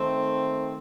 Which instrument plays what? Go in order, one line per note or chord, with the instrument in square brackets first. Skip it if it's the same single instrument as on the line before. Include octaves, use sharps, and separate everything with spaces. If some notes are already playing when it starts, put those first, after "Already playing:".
Already playing: [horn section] D#3 A3 C4